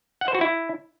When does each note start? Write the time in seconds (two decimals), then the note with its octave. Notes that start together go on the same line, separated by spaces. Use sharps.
0.21 F#5
0.28 C5
0.35 F#4
0.41 E4